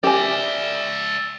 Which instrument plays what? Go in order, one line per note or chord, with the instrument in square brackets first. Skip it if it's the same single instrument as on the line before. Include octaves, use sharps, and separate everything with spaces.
[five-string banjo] G4 G#5 [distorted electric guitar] D5 E5